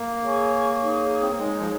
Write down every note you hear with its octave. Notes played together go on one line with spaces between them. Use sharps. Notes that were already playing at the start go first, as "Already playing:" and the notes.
Already playing: A#3
G#4 C#5 G#5 C#6
D#4 G#4 C#5
C4
A#3
G#3 D#4 G#4 C#5
F3